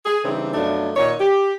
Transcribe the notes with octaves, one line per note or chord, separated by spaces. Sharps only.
G#4
C#3 E3 G3 C4 D4 D#4
F#2 B2 F3 A3 D4 D#4
A#2 D#3 D#4 C#5
G4